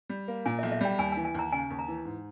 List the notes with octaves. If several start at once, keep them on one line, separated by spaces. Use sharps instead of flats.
G3
A#3
A#2 G#5
E5
B1
E5
G3 G5
D#2 G#5
G#5
E3
G#5
D#2 A#5
C#3 G#5
D#2
A#5
E3
G#2